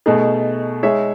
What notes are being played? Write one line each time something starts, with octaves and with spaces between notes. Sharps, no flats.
B2 A3 D#4 G#4
G#3 D#4 G#4 C#5 E5